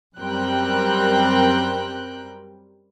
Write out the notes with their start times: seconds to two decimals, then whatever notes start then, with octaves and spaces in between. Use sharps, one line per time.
0.18 F#2 G3 C4 A#4 G5 F#6